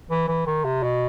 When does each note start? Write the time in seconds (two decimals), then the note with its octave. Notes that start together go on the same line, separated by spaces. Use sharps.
0.11 E3
0.28 E3
0.46 D#3
0.64 C3
0.83 B2